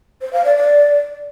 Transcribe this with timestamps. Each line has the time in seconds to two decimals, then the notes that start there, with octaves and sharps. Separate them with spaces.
0.22 C5
0.33 F5
0.45 D5
0.56 D5